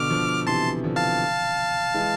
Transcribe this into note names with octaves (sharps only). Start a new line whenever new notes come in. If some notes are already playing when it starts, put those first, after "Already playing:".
Already playing: B2 D3 D6 F6
D3 F3
C3 E3 A5 C6
D3 F3
F5 A5
E3 G#3